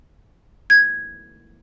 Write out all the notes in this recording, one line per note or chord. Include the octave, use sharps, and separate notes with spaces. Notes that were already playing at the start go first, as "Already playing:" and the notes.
G#6